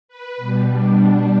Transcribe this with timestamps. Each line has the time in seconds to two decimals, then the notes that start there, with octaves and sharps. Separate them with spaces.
0.09 B4
0.37 B2 G3
0.66 D4